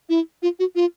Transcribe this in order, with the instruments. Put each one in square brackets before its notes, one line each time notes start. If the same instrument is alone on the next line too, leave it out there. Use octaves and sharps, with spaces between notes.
[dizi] E4
F4
F#4
F4